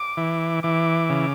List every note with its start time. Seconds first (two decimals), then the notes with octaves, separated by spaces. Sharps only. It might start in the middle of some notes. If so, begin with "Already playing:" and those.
Already playing: D6
0.17 E3
0.63 E3 D6
1.10 C#3